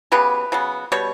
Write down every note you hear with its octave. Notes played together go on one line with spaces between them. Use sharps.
C#3 F#3 B3 G4 B4
C#3 F#3 B3
B2 G3 C#5